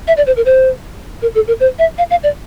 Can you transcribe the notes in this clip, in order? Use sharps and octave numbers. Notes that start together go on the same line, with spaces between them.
E5
D5
C5
A#4
C5
A#4
A4
A#4
C5
E5
F5
F5
D5